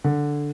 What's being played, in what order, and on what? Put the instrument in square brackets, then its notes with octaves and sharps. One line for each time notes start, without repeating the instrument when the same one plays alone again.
[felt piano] D3